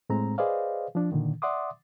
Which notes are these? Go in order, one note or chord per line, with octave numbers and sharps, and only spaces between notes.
A2 G#3 C4 A#5
G#4 B4 C5 D5 D#5 F5
F3 D4
A#2 D3 D#3
D5 E5 F#5 C6 D6 D#6